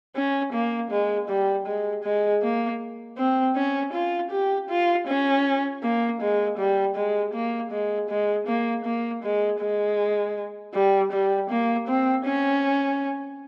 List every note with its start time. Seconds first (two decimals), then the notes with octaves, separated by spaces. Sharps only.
0.15 C#4
0.53 A#3
0.90 G#3
1.28 G3
1.66 G#3
2.03 G#3
2.42 A#3
3.17 C4
3.56 C#4
3.93 F4
4.31 G4
4.69 F4
5.07 C#4
5.82 A#3
6.20 G#3
6.58 G3
6.95 G#3
7.33 A#3
7.71 G#3
8.09 G#3
8.47 A#3
8.85 A#3
9.23 G#3
9.60 G#3
10.74 G3
11.12 G3
11.50 A#3
11.87 C4
12.25 C#4